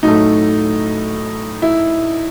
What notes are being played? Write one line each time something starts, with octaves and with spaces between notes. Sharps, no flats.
A2 F#3 A3 D#4
E4